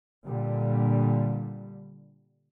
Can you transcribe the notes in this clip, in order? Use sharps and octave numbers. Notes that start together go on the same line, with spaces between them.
A#2 D3 G3